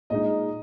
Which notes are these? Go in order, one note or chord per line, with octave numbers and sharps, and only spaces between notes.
A#2 G#3 D#4 D#5